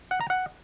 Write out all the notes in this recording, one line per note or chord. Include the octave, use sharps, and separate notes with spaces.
F#5
A#5
F#5